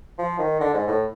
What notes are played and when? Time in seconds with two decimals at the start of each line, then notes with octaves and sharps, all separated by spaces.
0.18 F3
0.39 D#3
0.60 D3
0.74 G#2
0.88 A2